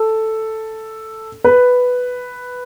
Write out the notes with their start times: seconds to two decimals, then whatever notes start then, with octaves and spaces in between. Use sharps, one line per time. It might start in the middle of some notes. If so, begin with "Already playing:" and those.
Already playing: A4
1.44 B4